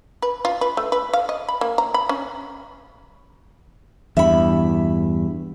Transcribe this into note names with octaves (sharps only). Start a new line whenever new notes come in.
B4
F4
B4
A3
B4
F5
D#5
B5
A#3
A#5
B5
C#4
E2 G2 E5 B5